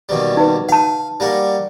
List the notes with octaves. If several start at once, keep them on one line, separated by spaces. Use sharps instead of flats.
D#2 B2 G3
D#4 B4
F5 F#5 A5
G3 A#3 F#4